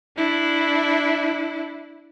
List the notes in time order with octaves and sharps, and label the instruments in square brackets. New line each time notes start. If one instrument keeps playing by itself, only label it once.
[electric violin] D4 E4